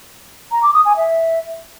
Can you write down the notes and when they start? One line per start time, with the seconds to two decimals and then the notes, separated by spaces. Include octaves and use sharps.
0.52 A#5
0.63 D6
0.74 D#6
0.85 G#5
0.97 E5